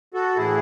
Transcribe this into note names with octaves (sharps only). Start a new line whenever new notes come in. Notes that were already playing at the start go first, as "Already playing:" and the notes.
F#4 A4
A2 E3 E4 G#4